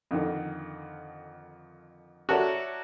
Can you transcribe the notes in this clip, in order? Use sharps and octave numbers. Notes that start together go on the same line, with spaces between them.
F2 D3 D#3
F#4 A4 A#4 C#5 D5 E5